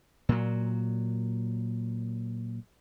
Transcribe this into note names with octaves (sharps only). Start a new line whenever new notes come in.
A#2 F#3